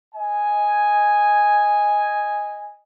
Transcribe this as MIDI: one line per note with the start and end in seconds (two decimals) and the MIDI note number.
0.15 2.78 75
0.15 2.78 80